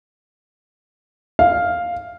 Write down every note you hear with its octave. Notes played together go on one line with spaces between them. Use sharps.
F5